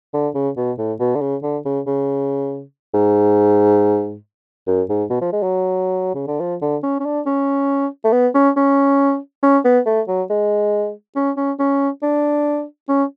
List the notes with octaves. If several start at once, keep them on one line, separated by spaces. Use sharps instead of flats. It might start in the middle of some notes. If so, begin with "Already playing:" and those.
D3
C#3
B2
A2
B2
D3
C#3
D3
C#3
C#3
G#2
F#2
G#2
B2
F3
G#3
F#3
C#3
D3
F3
D3
C#4
C#4
D4
C#4
A3
B3
C#4
C#4
C#4
B3
A3
F#3
G#3
C#4
C#4
C#4
D4
C#4